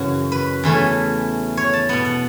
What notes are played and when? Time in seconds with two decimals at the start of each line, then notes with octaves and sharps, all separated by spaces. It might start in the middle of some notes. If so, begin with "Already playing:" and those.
Already playing: F#2 C#3 E3 F#4
0.32 B4
0.63 E2 E3 A3 C#4
1.57 C#5
1.73 A5
1.89 B2 B3 F#5
2.05 F#5